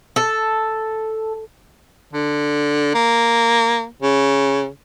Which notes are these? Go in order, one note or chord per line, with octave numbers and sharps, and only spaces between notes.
A4
D3
A#3
C#3